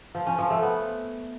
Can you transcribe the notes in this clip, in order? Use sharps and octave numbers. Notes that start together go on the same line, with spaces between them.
F3
C#4
F3
A3
B3